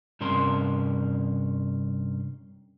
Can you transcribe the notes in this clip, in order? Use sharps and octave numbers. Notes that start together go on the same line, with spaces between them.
G2 C3 C#4 A#4 C6